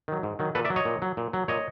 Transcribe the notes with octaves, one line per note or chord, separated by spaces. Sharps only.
D#3 F#3
G#2
D#3 F#3
A#2 A4 B4
D5 E5
F#3
C#5 D#5
A#2
F#3
A#2
F#3
A#2 C#5 D#5